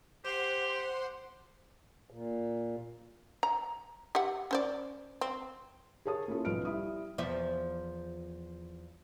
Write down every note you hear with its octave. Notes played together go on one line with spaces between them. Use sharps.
G4 C5 F#5 C6
A#2
A#5
G4 E5 F#5
C#4 C5 D5
C4
G#4 A#4 C#5 A5 D#6
A#3 C#4 E4 F4 A4 A#4
B1 F3 B4 F6 D7
G3 E4 D#6
E2 F3 E5